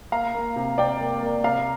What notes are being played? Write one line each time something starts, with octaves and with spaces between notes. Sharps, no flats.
A#3 F5 A#5
A#3
C3
C3 D5 G5
A#3
A#3
C3 F5 A#5